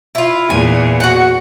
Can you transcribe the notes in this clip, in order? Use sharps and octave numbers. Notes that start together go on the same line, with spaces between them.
E4 F4
E2 A#2 G#5
F#4 F#5